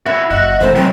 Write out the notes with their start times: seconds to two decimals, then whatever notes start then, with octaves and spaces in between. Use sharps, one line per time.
0.06 E4 F#4 E5
0.31 F#1 F#4 D#5 F#5
0.60 C3 E3 A3 D#4 C5
0.75 D#3 F#3 G#3 C4